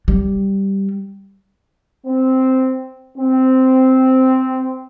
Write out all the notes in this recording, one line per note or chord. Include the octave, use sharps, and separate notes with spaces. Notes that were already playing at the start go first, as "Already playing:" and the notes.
G3
C4
C4